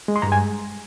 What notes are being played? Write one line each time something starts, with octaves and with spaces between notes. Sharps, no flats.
G#3
C6
G2 A#5
G#5